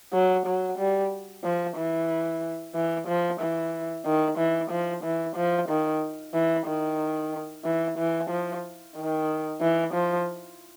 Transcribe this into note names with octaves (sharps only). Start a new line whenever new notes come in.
F#3
F#3
G3
F3
E3
E3
F3
E3
D#3
E3
F3
E3
F3
D#3
E3
D#3
E3
E3
F3
D#3
E3
F3